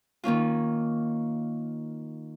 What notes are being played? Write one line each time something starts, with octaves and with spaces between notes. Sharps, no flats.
D#3 A#3 C#4 F4